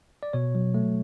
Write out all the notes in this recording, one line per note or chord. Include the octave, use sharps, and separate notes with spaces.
D5
B2 C#5
F#3
A3